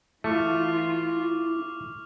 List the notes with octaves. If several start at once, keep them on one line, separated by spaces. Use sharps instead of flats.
E3 A3 E4 F4 C#6 D6 F6